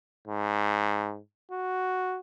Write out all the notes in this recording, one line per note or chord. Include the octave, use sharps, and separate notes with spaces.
G#2
F#4